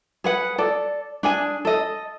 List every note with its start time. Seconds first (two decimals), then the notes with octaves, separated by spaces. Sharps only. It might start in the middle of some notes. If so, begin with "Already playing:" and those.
0.24 G#4 B4 F#5
0.58 A4 D5
1.23 D4 G#4 G#5
1.65 A4 D#5